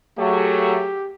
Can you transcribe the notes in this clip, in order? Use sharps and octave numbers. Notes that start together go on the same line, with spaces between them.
F#3 A3 G4 G#4